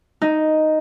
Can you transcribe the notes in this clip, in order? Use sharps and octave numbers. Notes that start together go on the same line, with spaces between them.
D#4